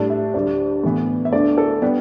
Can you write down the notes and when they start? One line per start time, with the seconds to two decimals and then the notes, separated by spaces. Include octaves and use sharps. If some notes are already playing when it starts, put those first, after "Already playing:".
Already playing: A2 G3 D4 A5
0.10 E5
0.34 D2 D3 G3 D5
0.83 A2 E3 B3
1.25 E5
1.32 D2 D3 A3 D5
1.58 A4
1.82 G3 B3 D4 G4